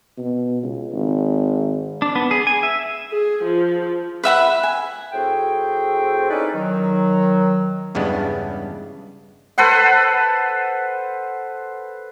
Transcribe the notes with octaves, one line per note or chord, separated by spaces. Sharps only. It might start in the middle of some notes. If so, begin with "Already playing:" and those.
B2
C#2
G#1
D4
B3
G#4
G#5
E5
G#4
F3
B4 E5 F#5 B5
G#5
A2 C4 F#4 G#4 G5
C#4 D#4 E4 A4 B4 D5
D#3 F#3
E2 G2 C#3 G#3 B3 D4
A4 B4 C5 F#5